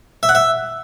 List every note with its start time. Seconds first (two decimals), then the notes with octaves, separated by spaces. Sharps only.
0.23 E5
0.29 F#5
0.35 E5